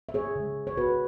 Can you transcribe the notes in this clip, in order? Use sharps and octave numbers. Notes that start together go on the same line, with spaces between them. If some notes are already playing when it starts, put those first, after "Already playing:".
E5
G#4 C#5
C#3 G#3
C#5
F#4 B4